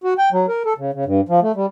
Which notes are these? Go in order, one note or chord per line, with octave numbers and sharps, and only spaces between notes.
F#4
G5
F#3
A#4
A4
C#3
C#3
G2
F3
A3
G3